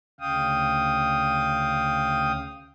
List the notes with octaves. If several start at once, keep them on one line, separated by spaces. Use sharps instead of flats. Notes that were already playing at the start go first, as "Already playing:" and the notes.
D2 C#3 F5 G5 D#6